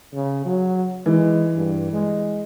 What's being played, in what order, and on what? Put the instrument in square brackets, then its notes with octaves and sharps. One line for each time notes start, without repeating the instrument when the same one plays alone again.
[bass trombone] C#3
F#3
[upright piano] E3 [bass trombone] G#3
[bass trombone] G2
G#3